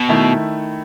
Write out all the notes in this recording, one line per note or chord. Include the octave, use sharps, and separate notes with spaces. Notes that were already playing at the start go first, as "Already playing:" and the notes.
Already playing: B2
D#3 A3 E4